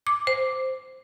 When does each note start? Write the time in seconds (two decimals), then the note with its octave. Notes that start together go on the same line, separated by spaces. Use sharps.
0.07 D6
0.27 C5